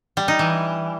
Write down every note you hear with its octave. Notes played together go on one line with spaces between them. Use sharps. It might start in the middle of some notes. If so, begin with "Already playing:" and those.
G3
D#4
E3